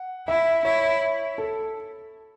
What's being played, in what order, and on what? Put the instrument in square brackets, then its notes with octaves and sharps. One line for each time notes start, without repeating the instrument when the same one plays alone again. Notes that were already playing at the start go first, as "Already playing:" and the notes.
Already playing: [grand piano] F#5
[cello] E4 [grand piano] E5
[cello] E4 [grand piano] C#5
[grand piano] A4